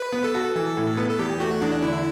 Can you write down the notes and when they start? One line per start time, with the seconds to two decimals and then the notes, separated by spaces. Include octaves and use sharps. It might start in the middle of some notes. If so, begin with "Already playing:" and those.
Already playing: B4
0.13 B3
0.24 A4
0.35 F#4
0.55 E3 A4
0.77 A2
0.97 B3
1.09 A4
1.19 E2 G4
1.40 A3 F#4
1.61 E2 D4
1.82 D3 E4